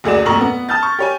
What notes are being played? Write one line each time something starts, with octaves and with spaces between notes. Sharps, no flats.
F#1 D2 G#4 D5 E7
F1 A#2 A#5 C#6 F#7
B3
A5 D#6 F6 G6 A6
C#6
G4 C#5 G#5